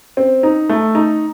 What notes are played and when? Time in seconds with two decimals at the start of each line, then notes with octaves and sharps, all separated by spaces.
0.17 C4
0.43 D#4
0.69 A3
0.95 D#4